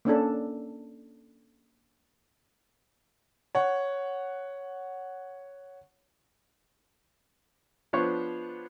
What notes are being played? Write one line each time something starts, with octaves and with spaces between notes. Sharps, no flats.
A#3 C#4 D4 A4
C#5 F#5
F3 B3 D4 C5 C#5